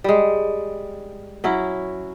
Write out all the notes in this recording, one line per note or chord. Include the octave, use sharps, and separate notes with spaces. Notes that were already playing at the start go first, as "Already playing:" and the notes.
G3 G#3
F#3 C#4 E4